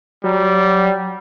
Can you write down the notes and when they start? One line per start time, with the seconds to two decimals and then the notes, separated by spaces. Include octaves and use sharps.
0.24 F#3 G3